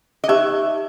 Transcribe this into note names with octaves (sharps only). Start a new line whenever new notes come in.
D#5
D#4 G4 C5 E5